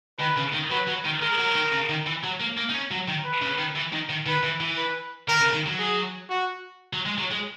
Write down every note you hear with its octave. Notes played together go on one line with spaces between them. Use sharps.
D#3 B4
C#3
D#3
F#3 B4
F#3
D#3
G#3 A#4
F#3
D#3
C#3
D#3
E3
F#3
A#3
A#3
D#4
C#4
F#3
D#3
B4
C#3
D#3
E3
D#3
D#3
D#3 B4
E3
E3
B4
D#3 A#4
C#3
D#3
F#3
G#4
F#4
F#3
G#3
F#3
G#3